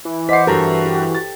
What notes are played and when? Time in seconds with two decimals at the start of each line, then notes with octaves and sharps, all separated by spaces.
0.05 E3
0.29 C5 D#5 F#5 D6 B6 C7
0.47 G2 F#4 A4 A#4
0.86 G4
1.15 A6